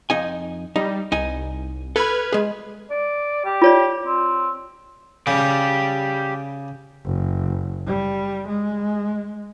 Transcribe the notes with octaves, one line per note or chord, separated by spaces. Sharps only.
F2 D#4 G#5
G3 D#4
C2 D#4 G#5
A4 B4 B5 F6 G#6
G#3 G#4
D5
G4
F4 C#5 D5
C4
C#3 G4 D5
F#1
G3
G#3